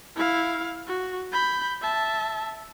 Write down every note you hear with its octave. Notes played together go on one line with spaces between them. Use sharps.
E4 F5
F#4
B5 G6
E5 A5